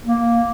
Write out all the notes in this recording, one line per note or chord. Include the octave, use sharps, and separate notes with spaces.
A#3